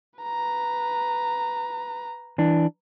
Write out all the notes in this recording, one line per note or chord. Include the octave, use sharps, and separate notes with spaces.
B4 A#5
E3 D4